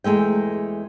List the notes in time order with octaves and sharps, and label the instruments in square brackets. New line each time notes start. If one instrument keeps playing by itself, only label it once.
[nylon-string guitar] E2 G#3 A3 G5